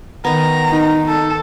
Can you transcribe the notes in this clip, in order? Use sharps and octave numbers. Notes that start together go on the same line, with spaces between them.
D#3 B3 A#5
D#4
A4